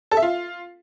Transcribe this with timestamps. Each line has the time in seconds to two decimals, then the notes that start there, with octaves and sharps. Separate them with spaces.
0.11 A4
0.17 E5
0.22 F4